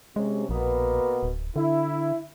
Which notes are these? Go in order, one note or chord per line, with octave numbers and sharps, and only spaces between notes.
C3 G#3 C#4
A#1 B2 A#3 B3
D1
D3 E4